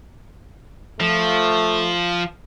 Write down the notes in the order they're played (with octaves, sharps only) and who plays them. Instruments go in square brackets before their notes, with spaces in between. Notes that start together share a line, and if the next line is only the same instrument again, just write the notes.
[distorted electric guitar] F3 [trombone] A3